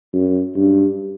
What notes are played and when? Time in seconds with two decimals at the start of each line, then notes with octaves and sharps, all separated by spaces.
0.13 F#2
0.56 G2